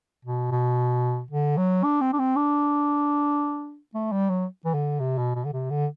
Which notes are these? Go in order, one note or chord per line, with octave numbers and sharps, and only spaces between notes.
B2
B2
D3
F#3
D4
C4
D4
C4
D4
A3
G3
F#3
E3
D3
C3
B2
B2
D3
C3
D3